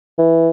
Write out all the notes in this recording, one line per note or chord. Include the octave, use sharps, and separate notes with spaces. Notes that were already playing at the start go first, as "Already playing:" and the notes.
E3